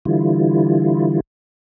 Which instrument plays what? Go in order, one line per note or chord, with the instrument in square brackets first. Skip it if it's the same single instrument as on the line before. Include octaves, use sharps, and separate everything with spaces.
[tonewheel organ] D3 E3 G3 E4 F4